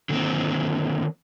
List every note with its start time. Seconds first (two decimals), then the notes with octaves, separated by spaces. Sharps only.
0.09 D3 D#3 A#3 C4